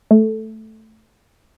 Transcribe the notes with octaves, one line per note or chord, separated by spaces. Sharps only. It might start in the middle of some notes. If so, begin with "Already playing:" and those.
A3